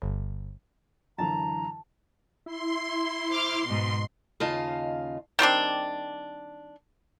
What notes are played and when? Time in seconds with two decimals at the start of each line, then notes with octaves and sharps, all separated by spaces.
0.02 G1
1.18 F#2 D3 E3 A5 A#5
2.46 E4 C6
3.30 C5 D6 F6
3.64 G#2 B2
4.40 D#2 C#3 F4 D#5 F5 A5
5.39 D#3 G3 C4 D4